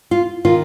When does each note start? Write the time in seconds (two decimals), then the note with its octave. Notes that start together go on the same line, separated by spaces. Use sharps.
0.11 F4
0.45 D#3 F4